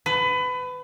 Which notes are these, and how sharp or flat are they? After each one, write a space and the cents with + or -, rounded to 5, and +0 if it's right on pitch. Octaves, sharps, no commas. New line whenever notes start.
B4 +25